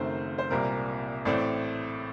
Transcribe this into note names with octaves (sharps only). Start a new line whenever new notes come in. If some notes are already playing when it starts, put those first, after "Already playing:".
Already playing: F#1 F#2 D#3 A3 C4 C5
C5
C2 A#2 G3 C4 A#4
A1 A2 A3 C4 D5